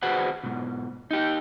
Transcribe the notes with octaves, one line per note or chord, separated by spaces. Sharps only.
F#4 G#4 B4 C5 F#5
G#2 B2
D#4 G4